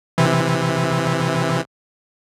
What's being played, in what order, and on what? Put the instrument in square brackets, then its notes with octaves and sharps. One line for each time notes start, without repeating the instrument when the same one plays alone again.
[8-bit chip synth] C3 E3